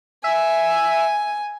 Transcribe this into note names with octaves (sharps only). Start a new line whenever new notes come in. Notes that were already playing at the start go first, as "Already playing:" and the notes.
E5 G#5